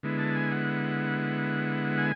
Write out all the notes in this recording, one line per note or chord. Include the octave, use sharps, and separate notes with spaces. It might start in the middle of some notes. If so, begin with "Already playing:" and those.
D3 G#3 B3 E4
A5
G#5
F#5
G#5